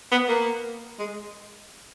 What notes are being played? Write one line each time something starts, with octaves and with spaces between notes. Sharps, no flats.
B3
A#3
G#3